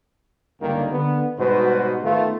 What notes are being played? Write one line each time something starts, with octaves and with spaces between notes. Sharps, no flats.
C#2 G2 D3 D#3 G3 A#3
D3 B3
G#2 B2 G3 F#4 B4 C5
D#3 A3 B3 F4